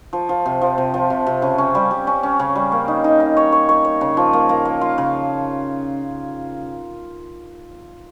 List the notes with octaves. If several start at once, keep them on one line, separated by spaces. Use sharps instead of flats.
F3
F3
C3
F3
C3
F3
C3
C3
C#3
C#4
G3
G3
C#4
C#4
C#3
G3
A#3
D#4
D#4
D#4
C#5
C#5
C#5
C#5
C#3
F3
A#3
A#3
A#3
F4
C#3